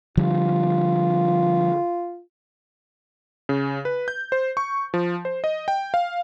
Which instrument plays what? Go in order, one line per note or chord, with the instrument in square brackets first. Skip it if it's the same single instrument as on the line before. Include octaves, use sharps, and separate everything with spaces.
[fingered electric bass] D3 F3 G3 [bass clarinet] F4
[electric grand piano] C#3
B4
G6
C5
C#6
F3
C5
D#5
G5
F5